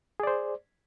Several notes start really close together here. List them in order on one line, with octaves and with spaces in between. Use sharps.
G#4 D5 C5